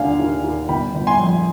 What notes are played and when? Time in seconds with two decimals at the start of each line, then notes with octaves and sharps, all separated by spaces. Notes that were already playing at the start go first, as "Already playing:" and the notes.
Already playing: D#2 D3 F5 G#5
0.19 D#2
0.44 D#2
0.69 G1 G5 B5
0.94 G1
1.07 G#5 C6
1.20 F2